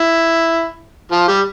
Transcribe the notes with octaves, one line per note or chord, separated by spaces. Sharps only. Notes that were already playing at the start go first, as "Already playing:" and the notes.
Already playing: E4
F3 F4
G3 G4